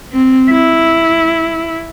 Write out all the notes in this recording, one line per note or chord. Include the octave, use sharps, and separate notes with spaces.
C4
E4